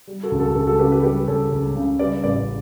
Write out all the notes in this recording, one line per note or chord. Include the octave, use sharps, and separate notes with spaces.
G3
F#4 A4
C#2
F#4 A4
C#2 F#4 A4
F#4 A4
C#3 G4 B4
G4 B4
G3 G4 B4
C#2 A4 C#5
C#2
C#3
G3 B4 D5
A1 B4 D5